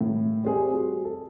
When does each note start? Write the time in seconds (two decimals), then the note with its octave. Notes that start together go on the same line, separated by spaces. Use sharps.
0.01 A2
0.43 G3 C4 G#4
0.73 F#4
1.04 A4